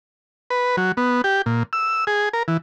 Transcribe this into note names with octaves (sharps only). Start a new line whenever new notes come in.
B4
F#3
B3
G4
A#2
E6
G#4
A#4
E3